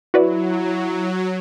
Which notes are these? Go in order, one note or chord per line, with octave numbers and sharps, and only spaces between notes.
F#3 E4 F#4 B4 D5